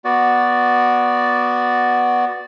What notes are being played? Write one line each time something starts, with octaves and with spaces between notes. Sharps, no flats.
B3 F#4 D5